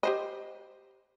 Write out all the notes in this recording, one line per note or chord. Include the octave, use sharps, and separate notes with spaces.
G4 C5 D#5